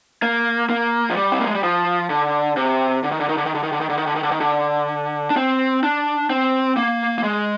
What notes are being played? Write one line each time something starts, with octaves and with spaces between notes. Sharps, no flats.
A#3
A#3
F3
G3
C4
A#3
G#3
G3
F3
D3
C3
D3
D#3
D3
D#3
D3
D#3
D3
D#3
D3
D#3
D3
D#3
D3
D#3
D3
D#3
D3
D4
C4
D4
C4
A#3
A#3
G#3